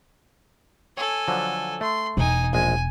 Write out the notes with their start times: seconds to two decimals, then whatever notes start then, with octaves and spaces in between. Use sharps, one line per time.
0.97 A4 C#5 G#5
1.28 D3 F3 F#3
1.81 A3 C6
2.17 E1 D#4 G#5
2.53 A#1 G#3 G#5